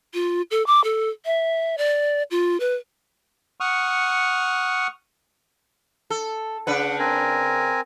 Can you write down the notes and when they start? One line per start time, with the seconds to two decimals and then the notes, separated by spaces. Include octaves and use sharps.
0.14 F4
0.51 A4
0.67 D6
0.84 A4
1.25 E5
1.78 D5
2.31 F4
2.60 B4
3.60 F#5 C#6 D#6 F6
6.10 A4
6.67 C#3 D4 B4 F#5
6.99 C4 A#4 G#5